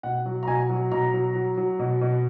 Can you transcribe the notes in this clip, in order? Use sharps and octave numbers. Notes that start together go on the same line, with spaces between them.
B2 F#5
F#3
A#5
B2 G#5
F#3
B2 A#5
F#3
F#3
F#3
B2
B2